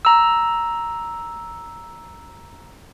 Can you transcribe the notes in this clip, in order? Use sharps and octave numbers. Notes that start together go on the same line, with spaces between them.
A#5 E6